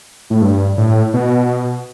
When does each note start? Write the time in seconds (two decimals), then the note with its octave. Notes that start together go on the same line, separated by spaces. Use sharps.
0.30 A2
0.42 G2
0.77 A2
1.14 B2